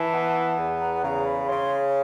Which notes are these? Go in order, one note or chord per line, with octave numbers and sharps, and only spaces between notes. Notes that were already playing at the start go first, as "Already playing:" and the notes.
Already playing: E3 A5
B3
E2
A#5
C#3 A#5
B5
C#3 C6